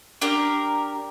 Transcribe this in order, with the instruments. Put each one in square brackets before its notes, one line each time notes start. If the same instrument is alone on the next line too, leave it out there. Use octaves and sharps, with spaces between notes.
[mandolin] D4 G4 A#4